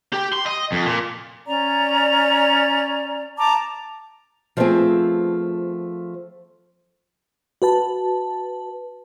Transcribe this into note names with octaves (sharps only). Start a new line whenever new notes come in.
G4
C6
D#5
F2
A#2
C#4 D5 A#5
A5 A#5 D6
F3 G3 A3 B3 C4 G#4
F#4 B4 A5